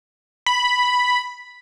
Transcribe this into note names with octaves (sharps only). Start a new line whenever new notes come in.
B5